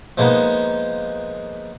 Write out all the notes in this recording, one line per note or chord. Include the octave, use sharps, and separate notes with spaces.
F3 G#3 A#3 B3 D#4